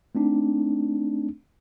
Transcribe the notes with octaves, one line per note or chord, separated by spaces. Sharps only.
A3 C4 D4 D#4